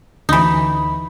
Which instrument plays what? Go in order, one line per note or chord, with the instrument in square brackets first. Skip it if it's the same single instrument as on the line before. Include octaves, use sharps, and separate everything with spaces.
[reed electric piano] D2 B5 [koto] E3 D#4